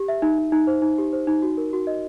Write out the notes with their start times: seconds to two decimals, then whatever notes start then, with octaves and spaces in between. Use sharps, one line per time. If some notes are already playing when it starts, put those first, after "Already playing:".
Already playing: G4
0.08 E5
0.22 D#4
0.38 D#4
0.52 D#4
0.67 C5
0.82 D#4
0.98 G4
1.13 C5
1.27 D#4
1.42 F#4
1.57 A#4
1.73 F#4
1.87 D#5